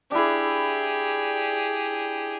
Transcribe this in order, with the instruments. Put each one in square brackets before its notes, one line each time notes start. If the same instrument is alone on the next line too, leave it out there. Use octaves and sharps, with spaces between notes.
[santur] D4 E4 [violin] G4 G#4